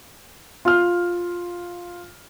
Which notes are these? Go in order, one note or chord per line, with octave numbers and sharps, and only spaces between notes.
F4 F6